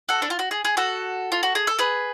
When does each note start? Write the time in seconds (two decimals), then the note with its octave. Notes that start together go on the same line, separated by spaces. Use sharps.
0.09 F#4 A4
0.22 D4
0.30 F4
0.39 F#4
0.51 G#4
0.65 G#4
0.77 F#4 A4
1.32 F4
1.43 F#4
1.55 G#4
1.67 A4
1.79 G#4 B4